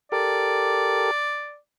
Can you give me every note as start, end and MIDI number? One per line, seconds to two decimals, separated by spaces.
0.12 1.11 67
0.12 1.11 69
0.12 1.11 70
0.12 1.57 74